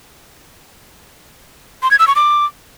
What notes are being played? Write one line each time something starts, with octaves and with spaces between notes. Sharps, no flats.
C6
G#6
E6
C#6
D6